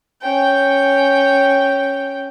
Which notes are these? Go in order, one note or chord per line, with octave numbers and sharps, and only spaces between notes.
C#4 G5